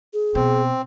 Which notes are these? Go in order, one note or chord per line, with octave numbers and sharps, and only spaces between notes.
G#4
B2 C4